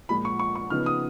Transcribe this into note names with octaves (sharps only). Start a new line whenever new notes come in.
A#2 F3 G#3 B5
C#6
C#6
C#6
C#3 F3 B3 D#4 F6
D#6